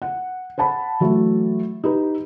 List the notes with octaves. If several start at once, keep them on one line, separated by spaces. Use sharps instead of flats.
F#5
C5 F#5 A5 B5
E3 F#3 A3
D#4 G4 B4